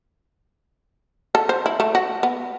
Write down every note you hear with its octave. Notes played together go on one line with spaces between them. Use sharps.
A4
C5
E4
A3
F#4
B3